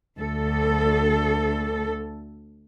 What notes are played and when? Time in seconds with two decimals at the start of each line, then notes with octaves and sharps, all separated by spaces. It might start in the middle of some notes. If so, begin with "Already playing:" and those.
0.19 D2 A4